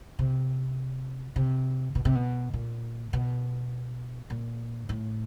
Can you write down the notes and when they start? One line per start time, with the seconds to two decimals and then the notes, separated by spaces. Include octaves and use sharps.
0.19 C3
1.36 C3
1.95 B2
2.05 C3
2.15 B2
2.54 A#2
3.13 B2
4.30 A#2
4.89 A2